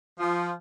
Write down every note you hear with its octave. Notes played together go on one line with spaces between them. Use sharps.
F3